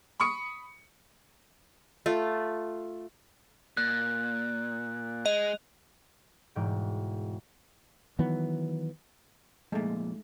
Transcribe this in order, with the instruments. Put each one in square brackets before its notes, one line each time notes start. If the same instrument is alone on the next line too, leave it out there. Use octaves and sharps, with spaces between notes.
[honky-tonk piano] B5 C#6 D#6 C#7
[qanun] A3 F4
[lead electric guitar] A#2 [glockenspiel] F#6
[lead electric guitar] G#3 [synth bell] D#5 [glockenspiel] F7
[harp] E1 G#2 G5
[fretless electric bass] D#3 E3 F#3 B3
[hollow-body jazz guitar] F2 A#2 [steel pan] G#3 A3